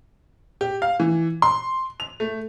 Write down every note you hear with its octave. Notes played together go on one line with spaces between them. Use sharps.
G4
F5
E3
C6
F7
A3